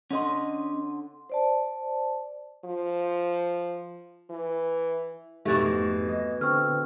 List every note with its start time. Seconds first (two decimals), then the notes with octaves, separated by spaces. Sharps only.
0.11 D3 C#4 D#5 C6
1.30 C5 D5 A5
2.65 F3
4.30 E3
5.45 F2 G#2 B2 E3 A3 G4 A6
6.09 D#5
6.41 D3 C4 C#6 E6 F6